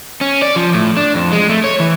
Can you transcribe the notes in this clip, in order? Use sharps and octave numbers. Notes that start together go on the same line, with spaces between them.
C#4
D5
F3
A2
D4
F2
G#3
A3
C#5
E3